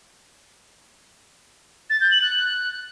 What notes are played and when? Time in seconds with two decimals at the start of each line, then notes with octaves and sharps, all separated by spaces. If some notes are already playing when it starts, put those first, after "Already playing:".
1.90 A6
2.01 G6
2.11 F#7
2.22 F#6